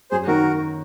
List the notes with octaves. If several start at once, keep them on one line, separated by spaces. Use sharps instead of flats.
F#2 G#4 C5
D#3 F#4 A#4